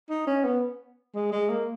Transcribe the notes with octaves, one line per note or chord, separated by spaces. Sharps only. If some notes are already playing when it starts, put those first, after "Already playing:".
D#4
C#4
B3
G#3
G#3
A#3